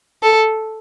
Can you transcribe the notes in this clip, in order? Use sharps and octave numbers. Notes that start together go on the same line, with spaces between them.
A4